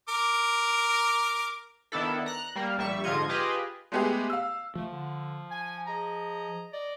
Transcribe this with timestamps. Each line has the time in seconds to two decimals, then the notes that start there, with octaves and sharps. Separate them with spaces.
0.09 A#4 D6
1.92 D#3 B3 D4 E4 A4
2.26 A#5 F#6
2.56 G3 A#3 A#4
2.78 A#1 G3 E5 C#6
3.04 G#2 D3 F3 F4 D#5 G#6
3.29 F4 G4 G#4 B4 D#5
3.92 G#3 A3 B3 G4 G#4
4.30 F5 E6
4.75 F3 A3
4.90 D3
5.50 G#5
5.87 G#4 D#5 A#5
6.72 D5 D#5